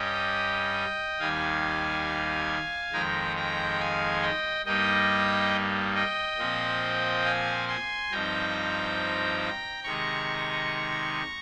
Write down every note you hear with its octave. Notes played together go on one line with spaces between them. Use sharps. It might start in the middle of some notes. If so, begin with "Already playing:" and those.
Already playing: G2 G3 C#4 D#5 G5
D#2 D#3 G3 F5 G#5
F2 D#3 G#3 G5 A#5
G5 A#5
F5 G#5
D#5 G5
G2 G3 A#3 D#4 D#5 G5
D#5 G5
A#2 F3 C4
F5 G#5
G#5 C6
G2 F3 C4 D#4 G5 A#5
C3 D#3 G#3 A#5 C#6